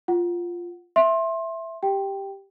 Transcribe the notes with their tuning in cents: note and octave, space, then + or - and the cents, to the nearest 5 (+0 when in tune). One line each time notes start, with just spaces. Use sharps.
F4 +0 F#5 +0
E5 +0 C6 +25
G4 +0 G5 +0